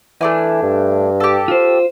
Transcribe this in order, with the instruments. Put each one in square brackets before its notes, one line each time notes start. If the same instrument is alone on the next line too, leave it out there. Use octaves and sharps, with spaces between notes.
[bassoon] E3 [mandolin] A3 D4 G#5
[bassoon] G2
[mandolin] G4 A4
[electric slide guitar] F4 C5